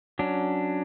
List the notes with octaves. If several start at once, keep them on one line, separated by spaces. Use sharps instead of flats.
F#3 C#4 D4